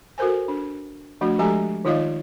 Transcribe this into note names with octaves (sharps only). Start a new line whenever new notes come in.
F#4 A4 A#4 C5 G#5
D4
F3 A3 D4 F#4
F3 G#3 G4 A4 G#5 A#5
D#3 D#4 F4 D5 D#5 F5